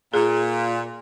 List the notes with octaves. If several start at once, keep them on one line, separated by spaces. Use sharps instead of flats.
A#2 G#4